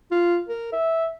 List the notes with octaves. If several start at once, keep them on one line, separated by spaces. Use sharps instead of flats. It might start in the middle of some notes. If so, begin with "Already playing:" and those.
F4
A#4
E5